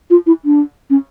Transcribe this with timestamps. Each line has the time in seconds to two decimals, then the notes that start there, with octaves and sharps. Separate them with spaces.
0.10 F4
0.27 E4
0.45 D4
0.90 C#4